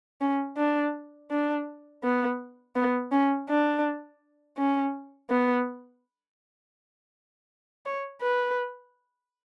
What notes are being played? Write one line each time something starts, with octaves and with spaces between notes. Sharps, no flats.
C#4
D4
D4
B3
B3
C#4
D4
C#4
B3
C#5
B4